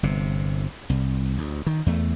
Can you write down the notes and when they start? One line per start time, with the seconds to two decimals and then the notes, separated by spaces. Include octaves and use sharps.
0.03 G1 C3
0.90 C2
1.38 D2
1.66 D#3
1.86 E2 A3